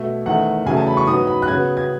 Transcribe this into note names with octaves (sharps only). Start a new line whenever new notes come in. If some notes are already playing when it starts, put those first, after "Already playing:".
Already playing: B2 A3 E5
E2 D#3 A3 F#5
E2 C#3 F#3 A3 G#5
A5
B5
C#6
G#2 F#3 B3 D#6
B5
F#6
C#3 F#3 B3 G#6
G#6